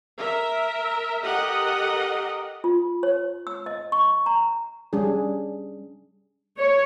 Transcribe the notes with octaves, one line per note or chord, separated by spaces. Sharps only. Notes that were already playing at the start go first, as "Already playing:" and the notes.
A#4 E5
G4 A4 A#4 D#5 F#5
F4
C#5
E6
D#5
C#6
A#5
G3 C#4 D4 G#4
C#5